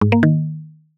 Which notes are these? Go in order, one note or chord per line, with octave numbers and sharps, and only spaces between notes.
G#2
A#3
D#3